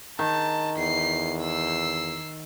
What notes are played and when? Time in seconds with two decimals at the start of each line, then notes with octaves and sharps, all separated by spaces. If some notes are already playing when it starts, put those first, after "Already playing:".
0.19 D#3 A5
0.78 E2 C7
1.42 E6 C7